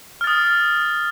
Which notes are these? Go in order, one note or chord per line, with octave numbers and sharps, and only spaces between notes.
D#6 F6 A6